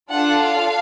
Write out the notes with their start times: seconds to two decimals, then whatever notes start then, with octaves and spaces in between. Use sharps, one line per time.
0.10 D4 F4 A4 F#5
0.41 F5